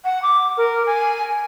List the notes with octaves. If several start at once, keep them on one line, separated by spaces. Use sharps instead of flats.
F#5
D6
A#4
G#5